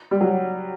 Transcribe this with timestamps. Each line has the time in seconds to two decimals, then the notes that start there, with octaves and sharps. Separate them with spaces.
0.11 G3
0.21 F#3